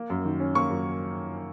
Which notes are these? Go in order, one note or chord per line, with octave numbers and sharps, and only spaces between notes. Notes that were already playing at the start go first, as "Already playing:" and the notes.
Already playing: A#3
F#2
D#3
C#4
A#3 C#6
F#2